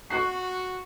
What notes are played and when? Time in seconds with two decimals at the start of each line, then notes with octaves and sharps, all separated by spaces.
0.10 F#4 C#6 F#6 C7